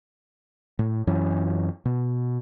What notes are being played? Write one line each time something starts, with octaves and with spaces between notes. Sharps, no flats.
A2
F#2 E3 C#4
B2